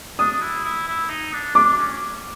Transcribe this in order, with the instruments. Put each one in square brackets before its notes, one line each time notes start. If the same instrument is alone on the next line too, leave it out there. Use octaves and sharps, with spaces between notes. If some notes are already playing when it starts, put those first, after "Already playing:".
[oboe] D4 [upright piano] D#6
[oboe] E4
E4
E4
D#4
D4
[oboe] D4 [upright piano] D6
[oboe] C#4